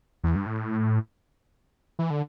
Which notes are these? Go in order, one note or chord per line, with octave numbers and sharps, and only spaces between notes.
E2
G2
A2
E3
D3